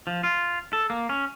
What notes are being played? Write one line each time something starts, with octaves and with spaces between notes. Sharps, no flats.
F3
F4
A4
A#3
C#4